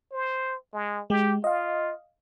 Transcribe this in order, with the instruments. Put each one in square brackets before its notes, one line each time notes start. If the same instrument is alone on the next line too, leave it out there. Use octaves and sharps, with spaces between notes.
[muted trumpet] C5
G#3
[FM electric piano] G#3 [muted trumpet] G4
[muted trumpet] F4 [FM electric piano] D#5 F5